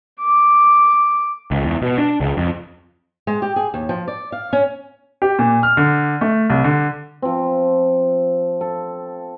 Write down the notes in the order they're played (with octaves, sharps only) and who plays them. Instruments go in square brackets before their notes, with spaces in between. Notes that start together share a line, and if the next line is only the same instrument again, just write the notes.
[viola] D6
[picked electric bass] C#2
E2
B2
D4
C#2
F2
[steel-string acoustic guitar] G#3
G4
G#4
D#2
F3
D5
F5
C#4
[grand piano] G4
A#2
F6
D3
A3
C2
D3
[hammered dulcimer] F3 C4
A4